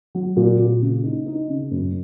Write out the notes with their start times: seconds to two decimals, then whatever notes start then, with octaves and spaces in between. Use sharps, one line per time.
0.15 F#3
0.37 A#2
0.59 A#2
0.81 C#3
1.04 D#4
1.26 D#4
1.49 C#3
1.71 F#2